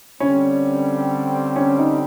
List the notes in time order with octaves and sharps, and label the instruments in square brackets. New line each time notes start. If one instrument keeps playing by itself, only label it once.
[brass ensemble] D3 G3 C4 [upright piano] C#4
[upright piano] C#4
D#4